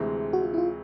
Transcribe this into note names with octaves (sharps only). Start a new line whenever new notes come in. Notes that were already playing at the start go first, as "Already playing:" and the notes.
Already playing: D2 C3 E3 G#3 C4
F#4
F4
E4
F4